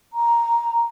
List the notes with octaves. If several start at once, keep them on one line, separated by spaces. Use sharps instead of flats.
A#5